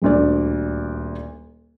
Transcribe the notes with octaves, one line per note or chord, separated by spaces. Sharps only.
D#1 D2 D5